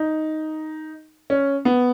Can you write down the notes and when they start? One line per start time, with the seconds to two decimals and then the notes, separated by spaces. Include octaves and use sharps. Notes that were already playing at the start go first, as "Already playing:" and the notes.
Already playing: D#4
1.30 C#4
1.65 B3